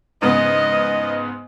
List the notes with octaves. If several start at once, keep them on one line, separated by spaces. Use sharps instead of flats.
G#2 C#3 B3 D#5